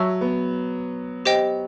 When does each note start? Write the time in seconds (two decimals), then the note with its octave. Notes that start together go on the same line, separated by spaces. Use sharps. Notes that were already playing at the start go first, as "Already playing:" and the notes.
Already playing: F#3 C#5 E5 A5 C#6 E6
0.21 B3
1.25 G4 C5 D#5 G5